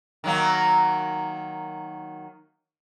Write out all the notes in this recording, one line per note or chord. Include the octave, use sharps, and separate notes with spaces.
D#3 F#3 A#3